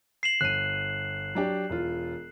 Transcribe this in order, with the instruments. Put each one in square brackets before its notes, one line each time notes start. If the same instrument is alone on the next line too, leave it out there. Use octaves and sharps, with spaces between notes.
[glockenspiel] C7 E7 F#7
[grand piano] G1 D#7 [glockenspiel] F#6
[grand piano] F#3 D4 G4
E1 F4